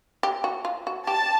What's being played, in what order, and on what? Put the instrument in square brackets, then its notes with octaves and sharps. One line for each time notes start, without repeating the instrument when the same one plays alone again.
[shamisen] G4
F#4
F4
F#4
[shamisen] G4 [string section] A5